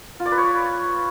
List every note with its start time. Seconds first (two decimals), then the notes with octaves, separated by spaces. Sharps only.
0.20 F4
0.26 D5
0.32 B4
0.38 C#5